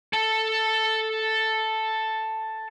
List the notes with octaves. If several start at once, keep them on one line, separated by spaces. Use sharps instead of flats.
A4 A5